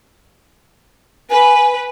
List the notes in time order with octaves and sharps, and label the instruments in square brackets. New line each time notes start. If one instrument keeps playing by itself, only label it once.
[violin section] B4 [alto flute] G#5